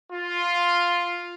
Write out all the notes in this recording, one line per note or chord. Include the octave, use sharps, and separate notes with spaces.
F4